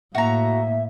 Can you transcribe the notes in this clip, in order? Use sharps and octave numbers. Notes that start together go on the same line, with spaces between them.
A2 A#3 F#4 E5 A#5